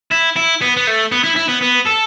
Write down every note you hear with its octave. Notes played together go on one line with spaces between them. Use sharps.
E4
E4
B3
B3
A3
B3
E4
E4
B3
B3
A4